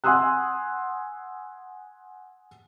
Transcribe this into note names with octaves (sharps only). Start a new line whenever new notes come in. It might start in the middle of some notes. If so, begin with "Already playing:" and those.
F#5 G#5 C6 D#6 E6 F#6